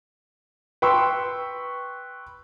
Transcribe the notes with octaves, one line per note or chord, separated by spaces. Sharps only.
B4 G5 C6 C#6 E6